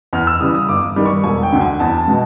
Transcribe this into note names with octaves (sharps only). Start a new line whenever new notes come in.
E2 F6
E6
C#3 E3 G3 D#6
D#6
G1 D6
G2 D#3 G3
C#6
E1 G#5
G5
D2 D3
G#5
E2 A5
A5
B2 G#3